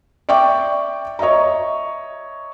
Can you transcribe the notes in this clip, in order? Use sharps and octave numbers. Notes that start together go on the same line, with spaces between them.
D5 E5 G5 C#6 D6
C#5 D#5 E5 A#5